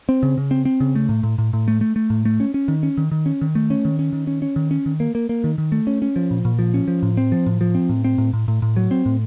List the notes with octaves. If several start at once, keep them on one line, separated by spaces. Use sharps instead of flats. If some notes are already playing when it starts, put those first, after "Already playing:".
C4
C#3
C#3
C4
C4
C#3
A3
A2
A2
A2
A2
A3
A3
A3
A2
A3
C#4
C#4
D#3
C#4
D#3
D#3
C#4
D#3
A3
C#4
D#3
C#4
D#3
C#4
C#4
D#3
C#4
D#3
A#3
A#3
A#3
D#3
D#3
A3
C#4
C#4
F3
A#2
A#2
F3
C#4
F3
A2
C4
F3
A2
F3
C4
A2
C4
A2
A2
A2
A2
F#3
C4
A2